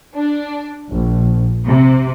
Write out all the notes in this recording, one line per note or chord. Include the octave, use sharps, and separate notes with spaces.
D4
A#1
C3